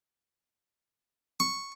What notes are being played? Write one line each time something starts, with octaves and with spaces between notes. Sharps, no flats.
C#6